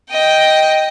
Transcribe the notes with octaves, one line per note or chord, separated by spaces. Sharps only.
D#5 G5